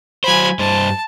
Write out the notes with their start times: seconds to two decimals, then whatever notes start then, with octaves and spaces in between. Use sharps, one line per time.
0.24 F#3 C5 G#5 B5
0.59 G2 C5 A5